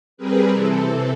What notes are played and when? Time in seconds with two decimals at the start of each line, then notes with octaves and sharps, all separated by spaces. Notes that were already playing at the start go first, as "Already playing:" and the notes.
0.17 G3 C4 G#4 A#4 B4
0.52 C3 E3 C4 A4